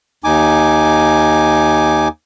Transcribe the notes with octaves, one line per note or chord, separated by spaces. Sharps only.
D#2 D#4 G#5 D6